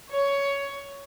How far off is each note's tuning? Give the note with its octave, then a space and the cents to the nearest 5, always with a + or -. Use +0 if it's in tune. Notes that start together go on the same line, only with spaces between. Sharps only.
C#5 +10